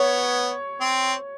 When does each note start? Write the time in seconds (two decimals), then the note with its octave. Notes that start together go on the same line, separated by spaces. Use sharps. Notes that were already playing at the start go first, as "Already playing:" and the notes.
Already playing: B3 C#5
0.81 C4